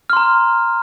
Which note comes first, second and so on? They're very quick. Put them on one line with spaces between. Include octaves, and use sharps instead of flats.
F6 C6 A#5